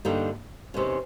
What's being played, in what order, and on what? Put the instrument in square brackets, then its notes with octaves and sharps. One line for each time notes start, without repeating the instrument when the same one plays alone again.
[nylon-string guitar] G2 D3 G3 A#3 D#4
E2 C3 D#3 G#3 C#4